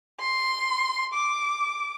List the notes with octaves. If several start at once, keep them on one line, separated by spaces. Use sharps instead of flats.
C6
D6